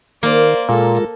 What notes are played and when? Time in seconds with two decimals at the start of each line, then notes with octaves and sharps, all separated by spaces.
0.23 D#3 A#3 C5 D5
0.69 A#2 G#3 F4 A4 A#4